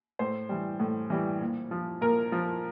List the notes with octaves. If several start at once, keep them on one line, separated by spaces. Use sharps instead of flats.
A2 C5
E3 G3
A2
E3 G3
A#2
F3
A#2 A#4
F3